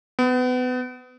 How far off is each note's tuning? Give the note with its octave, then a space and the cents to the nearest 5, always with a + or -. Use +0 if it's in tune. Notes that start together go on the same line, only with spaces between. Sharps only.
B3 +30